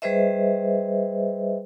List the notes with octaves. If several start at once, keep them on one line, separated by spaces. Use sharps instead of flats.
G3 G#4 B4 C5 D#5 E5